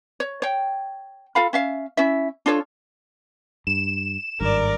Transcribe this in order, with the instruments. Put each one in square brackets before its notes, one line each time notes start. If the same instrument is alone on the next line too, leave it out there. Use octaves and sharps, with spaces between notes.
[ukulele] C#5
C#5 G5
F4 A4 F5 B5
C#4 E5 F5
C#4 E4 E5
D4 F4 A4 C#5
[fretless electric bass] G2 [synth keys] E7
[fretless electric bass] G#1 G2 [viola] A#4 D5